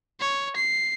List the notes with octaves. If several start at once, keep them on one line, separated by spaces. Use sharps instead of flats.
C#5
C7